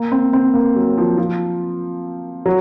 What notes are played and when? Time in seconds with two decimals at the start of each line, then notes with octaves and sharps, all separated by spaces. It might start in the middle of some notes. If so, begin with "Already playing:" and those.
Already playing: A#3
0.12 C4
0.33 C4
0.54 A#3
0.76 F#3
0.97 F3
1.18 F3
2.46 F#3